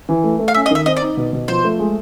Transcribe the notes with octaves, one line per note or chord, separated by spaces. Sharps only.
E3
A3
A3
F5
C#4 E5
D#5
D#3 E5
C4 D#5
D5
D#4
B2
B2
F3 C5
A3
G#3